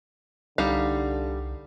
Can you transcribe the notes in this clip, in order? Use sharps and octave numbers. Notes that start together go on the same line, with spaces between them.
C2 D3 G3 D#4 F5